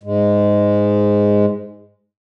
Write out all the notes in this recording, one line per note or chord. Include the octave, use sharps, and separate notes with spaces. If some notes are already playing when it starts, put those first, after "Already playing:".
G#2 G#3